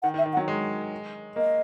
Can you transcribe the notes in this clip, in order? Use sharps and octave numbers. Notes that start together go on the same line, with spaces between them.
D#3 F#5
D#3
E5
D#3
F#5
F#3
G#3
A#3 D#5